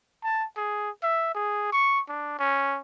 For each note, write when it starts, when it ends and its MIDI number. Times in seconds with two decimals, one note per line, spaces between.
0.24 0.45 81
0.56 0.90 68
1.03 1.34 76
1.35 1.68 68
1.73 2.01 85
2.09 2.35 62
2.39 2.79 61